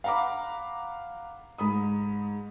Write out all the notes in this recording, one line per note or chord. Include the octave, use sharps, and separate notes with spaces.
F5 F#5 A#5 B5 D6
G#2 B5 D#6